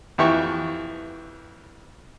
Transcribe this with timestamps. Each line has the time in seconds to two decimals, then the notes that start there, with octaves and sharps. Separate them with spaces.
0.18 F2 E3 G4 E5 C#6